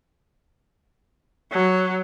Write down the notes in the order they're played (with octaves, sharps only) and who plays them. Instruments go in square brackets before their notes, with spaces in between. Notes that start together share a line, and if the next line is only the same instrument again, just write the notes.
[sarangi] F#3